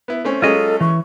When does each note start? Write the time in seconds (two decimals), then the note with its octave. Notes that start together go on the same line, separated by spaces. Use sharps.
0.08 B3 E4
0.24 A3 C4 C#4
0.42 F#3 G#3 C#4 F4 A4 D#5
0.81 E3 C#6